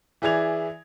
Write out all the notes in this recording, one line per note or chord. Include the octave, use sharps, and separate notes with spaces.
E3 E4 G#4 D5 G#6 F7